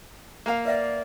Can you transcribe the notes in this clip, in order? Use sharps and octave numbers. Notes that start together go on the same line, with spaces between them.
A#3 F5
B4 D5 E5 F#5